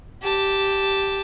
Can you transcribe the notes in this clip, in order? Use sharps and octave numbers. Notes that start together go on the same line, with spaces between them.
G4 A5